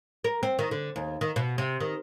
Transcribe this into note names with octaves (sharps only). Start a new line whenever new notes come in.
A#4
C4
D#3
D3
D#2
D#3
B2
C3
D#3